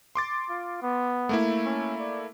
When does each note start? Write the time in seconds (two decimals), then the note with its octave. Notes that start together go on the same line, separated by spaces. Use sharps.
0.15 C6 D6 A6
0.49 F4
0.82 B3
1.29 A3 A#3 E4
1.65 C#4
2.00 D5